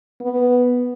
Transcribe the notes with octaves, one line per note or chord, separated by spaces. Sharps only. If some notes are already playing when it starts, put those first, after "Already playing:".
B3